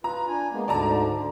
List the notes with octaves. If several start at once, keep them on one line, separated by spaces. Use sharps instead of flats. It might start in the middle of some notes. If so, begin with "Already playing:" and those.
F4 B4 A#5
D4 G#5
G#3 A#3 B3
D2 G#2 D3 D5 A5 A#5
D3